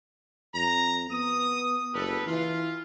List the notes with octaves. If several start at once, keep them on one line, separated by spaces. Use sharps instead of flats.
F2 A#5
B3 D#6
F#1 G4 A4 B4
E3 F4